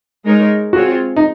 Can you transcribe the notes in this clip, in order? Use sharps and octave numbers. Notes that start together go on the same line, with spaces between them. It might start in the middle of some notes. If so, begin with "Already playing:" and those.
G#3 D#4 A#4 C#5
C4 F4 F#4 G#4 C#5
D#4